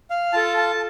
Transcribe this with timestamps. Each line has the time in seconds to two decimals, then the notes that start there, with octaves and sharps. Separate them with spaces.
0.10 F5
0.33 F4 A4 A5
0.57 A5